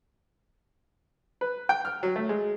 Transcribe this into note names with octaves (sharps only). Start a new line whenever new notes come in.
B4
G5
F6
F#3
A3
G#3